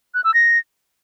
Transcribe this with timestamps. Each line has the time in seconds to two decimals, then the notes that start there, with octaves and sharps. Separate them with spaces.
0.14 F#6
0.24 E6
0.34 A#6